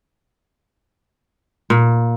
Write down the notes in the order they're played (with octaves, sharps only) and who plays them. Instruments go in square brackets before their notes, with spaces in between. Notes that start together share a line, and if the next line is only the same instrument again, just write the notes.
[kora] A#2